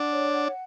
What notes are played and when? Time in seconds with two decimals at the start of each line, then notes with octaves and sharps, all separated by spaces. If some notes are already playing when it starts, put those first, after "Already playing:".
Already playing: D4 F#5
0.12 C#5
0.32 F#5